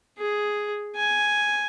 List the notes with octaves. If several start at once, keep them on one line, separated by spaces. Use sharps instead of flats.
G#4
G#5